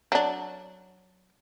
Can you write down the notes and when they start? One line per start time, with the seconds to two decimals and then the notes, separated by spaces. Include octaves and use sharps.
0.12 F#3 D4